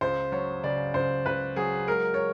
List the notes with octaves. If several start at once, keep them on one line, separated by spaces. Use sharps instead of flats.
C#2 C5
F#3 C#5
C#3 D5
C#2 C5
C#2 B4
F#3 G#4
G#3 A#4
C#5